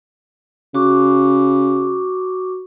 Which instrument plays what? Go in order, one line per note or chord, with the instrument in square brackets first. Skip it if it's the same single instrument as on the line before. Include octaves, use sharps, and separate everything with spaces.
[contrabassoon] C#3 [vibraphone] F#4 C#6 D6